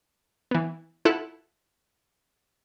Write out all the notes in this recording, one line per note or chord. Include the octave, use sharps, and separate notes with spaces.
E3 B3
E4 F4 A4 F#5 F#6 E7